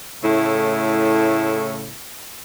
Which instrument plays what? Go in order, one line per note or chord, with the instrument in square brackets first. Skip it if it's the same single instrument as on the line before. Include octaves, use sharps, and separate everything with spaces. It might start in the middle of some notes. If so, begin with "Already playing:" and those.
[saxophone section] A2 C#3 A3 E4